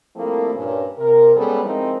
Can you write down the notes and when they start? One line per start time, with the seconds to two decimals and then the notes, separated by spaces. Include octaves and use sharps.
0.16 F3 G3 A3 A#3 C4 E4
0.54 G2 A#2 C#4
0.98 C3 A#4
1.35 G3 G#3 B3 C#4 G#4 A4
1.64 F3 G#3 C4 D#4 E4 A#4